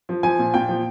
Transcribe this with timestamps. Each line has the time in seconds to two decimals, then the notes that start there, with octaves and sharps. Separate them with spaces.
0.09 F3
0.23 F3 G#5
0.39 A#2
0.54 A#2 G5
0.68 F3